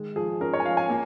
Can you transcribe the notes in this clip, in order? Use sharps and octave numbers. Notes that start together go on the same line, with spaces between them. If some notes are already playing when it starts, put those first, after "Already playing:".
Already playing: D#3 G#3
F3 G#4
C#4 A#4
C#5
G#5
F3 F5
G#5
A#3